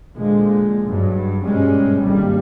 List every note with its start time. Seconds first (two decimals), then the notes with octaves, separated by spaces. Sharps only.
0.15 A#2 D3 F3 G#3
0.87 G2 F#3
1.44 G#2 B2 G3 G#3 C#4
2.03 G#1 G#2 D3 G3 A#3